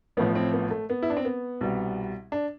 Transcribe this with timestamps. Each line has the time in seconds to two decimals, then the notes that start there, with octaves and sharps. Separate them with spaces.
0.17 A1 A2 F3 B3
0.35 C4
0.53 B3
0.71 A3
0.90 B3
1.02 E4
1.10 D4
1.17 C4
1.25 B3
1.61 C2 B2 G3
2.32 D4